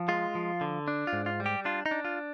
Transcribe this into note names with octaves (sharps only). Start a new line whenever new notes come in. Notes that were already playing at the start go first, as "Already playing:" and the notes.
Already playing: F3
G#3 F4
F3
D3
D4
F4
G#2
F4
G3
G4
D4 F4
D#4
D4
F4